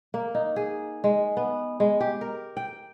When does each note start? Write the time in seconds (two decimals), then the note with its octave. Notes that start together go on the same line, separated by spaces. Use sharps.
0.14 A#3
0.35 D#4
0.56 G#4
1.04 G#3
1.37 B3
1.80 G#3
2.00 G4
2.21 A#4
2.57 G5